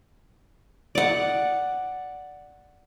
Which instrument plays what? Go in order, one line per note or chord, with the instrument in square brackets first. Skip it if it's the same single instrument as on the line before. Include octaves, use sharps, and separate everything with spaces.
[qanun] D5 F#5